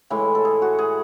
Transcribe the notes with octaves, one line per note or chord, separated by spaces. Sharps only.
A2 E3 G#3 E4
A4
G#4
F#4
G#4